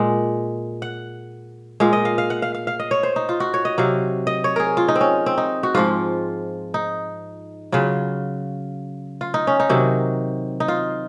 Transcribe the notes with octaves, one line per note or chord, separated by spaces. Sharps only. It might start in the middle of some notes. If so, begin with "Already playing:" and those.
Already playing: A#2 G#3 F#5
F#5
A#2 G#3 F5
D#5
F5
F5
F#5
F5
F5
F5
D#5
C#5
C5
D#4
F4
F#4
C#5
D#5
C3 F#3 F5
D#5
C#5
G#4 A#4
F4
D#4
C4
C#4
C4
D#4
F#4
G#2 F3 G#3 F4
D#4
C#3 F#3 F4
F4
D#4
C#4
D#4
C3 D#3 F#3
D#4
F4